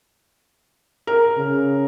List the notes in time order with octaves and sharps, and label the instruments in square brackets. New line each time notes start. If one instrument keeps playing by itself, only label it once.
[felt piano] A#4
[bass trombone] C#3